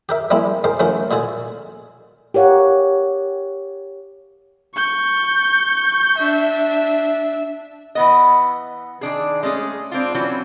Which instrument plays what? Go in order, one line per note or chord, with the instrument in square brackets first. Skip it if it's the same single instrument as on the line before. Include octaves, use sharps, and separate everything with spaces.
[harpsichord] G4 A#4 E5
F3 G3 G#3 A#3 C4 E4
G#3 G4 A#4 C5
D#3 F3 A3 C#4 F#4 A#4
A#2 G#3 F#4 A4 G#5
[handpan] G4 A#4 C#5 F5 F#5
[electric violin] C#6 G6
D4 E5
[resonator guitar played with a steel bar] E3 B3 D#5
D#3 D4 G#4
G#3 A3 C#4 G#4
C4 D4 F4
E3 F#3 C4 C#4